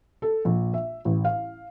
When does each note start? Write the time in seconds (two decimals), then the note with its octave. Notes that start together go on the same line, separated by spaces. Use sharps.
0.22 A4
0.45 A#1
0.74 E5
1.05 A1
1.25 F5